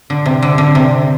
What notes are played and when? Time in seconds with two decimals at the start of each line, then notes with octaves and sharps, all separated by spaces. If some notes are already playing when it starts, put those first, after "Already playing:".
0.10 D3
0.26 C3
0.42 D3
0.58 D3
0.75 C3